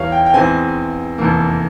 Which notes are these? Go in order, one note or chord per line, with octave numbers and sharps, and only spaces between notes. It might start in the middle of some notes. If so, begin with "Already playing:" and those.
Already playing: E2 E3 G3 C#5 F5
G5
G5
E2 E3 G#3 C4 G#5
F1 E2 E3 A#3